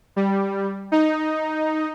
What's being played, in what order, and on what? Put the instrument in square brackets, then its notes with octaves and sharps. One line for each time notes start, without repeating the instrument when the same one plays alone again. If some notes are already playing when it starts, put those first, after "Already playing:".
[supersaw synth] G3
D#4